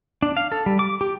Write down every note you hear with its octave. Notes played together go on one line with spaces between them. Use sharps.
D4
F5
A4
G3
D6
G4